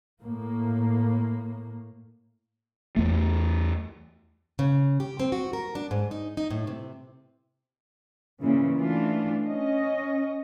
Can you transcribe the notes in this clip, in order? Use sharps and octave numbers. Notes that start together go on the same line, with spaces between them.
A2 A#3
E2 A3
C#3
G4
C4
F#4
A#4
D4
G#2
D#4
D#4
A2
C3
A#2 C#3 E3
E3 A3 D4 F4
C#4 D#5